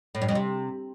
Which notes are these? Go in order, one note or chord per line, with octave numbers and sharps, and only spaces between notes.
A2
G2
F2
C3